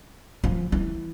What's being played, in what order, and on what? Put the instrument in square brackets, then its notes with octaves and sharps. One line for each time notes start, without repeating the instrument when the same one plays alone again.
[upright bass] F3
E3